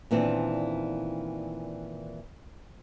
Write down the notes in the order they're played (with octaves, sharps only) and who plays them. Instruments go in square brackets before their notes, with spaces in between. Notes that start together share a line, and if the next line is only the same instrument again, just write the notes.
[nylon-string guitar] A#2 D#3 E3 B3 C4 D4